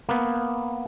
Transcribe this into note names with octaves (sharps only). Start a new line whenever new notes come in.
A#3 B3